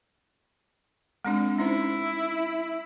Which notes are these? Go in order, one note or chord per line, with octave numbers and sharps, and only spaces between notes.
G#3 C4 D4
C#4 D#4 E4 C5